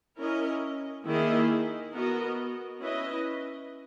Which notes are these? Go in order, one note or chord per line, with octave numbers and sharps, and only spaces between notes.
C#4 E4 A#4 D#5
D#3 A#3 E4 G#4 D#5
B3 F#4 A#4 D#5
C#4 E4 B4 D#5